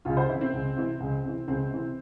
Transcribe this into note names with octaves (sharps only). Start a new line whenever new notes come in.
C#2 F4
C5
C3 E3 E4
C4
C#2
C3 E3
C#2
C3 E3
C#2 C4
C3 E3